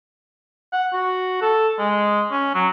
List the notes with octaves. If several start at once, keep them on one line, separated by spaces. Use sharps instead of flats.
F#5
F#4
A4
G#3
C#4
F#3